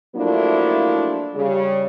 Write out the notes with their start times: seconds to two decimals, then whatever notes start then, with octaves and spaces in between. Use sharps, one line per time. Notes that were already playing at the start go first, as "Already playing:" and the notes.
0.16 F3 F#3 A3 A#3 D4 E4
1.35 C#3 G3